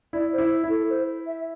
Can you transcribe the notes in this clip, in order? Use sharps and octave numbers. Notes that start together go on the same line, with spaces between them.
E4 D5
C5
E4
E4
A4
C5
E5